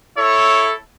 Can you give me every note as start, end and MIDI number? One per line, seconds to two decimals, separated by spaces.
0.17 0.73 64
0.17 0.73 69
0.17 0.73 73